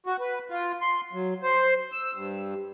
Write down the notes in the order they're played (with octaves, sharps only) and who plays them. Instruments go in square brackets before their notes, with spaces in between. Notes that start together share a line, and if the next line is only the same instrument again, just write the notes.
[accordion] F#4
B4
F4
C6
F#3
C5
E6
G2